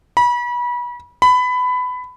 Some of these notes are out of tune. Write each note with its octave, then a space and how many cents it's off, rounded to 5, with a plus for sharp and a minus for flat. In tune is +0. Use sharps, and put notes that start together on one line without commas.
B5 -30
B5 +20